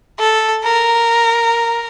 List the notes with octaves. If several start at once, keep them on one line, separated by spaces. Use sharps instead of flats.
A4
A#4